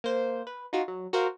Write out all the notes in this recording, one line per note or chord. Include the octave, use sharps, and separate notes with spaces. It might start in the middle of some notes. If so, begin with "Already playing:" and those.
A#3 C5
B4
D#4 F4 F#4
F#3
F#4 A#4 C5 F5